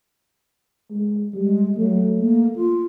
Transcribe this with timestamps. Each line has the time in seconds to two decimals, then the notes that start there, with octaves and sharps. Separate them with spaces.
0.90 G#3
1.34 G3 G#3
1.77 F#3 A3
2.18 A#3
2.56 F4